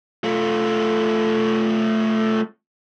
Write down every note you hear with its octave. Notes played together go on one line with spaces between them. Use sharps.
A3 F4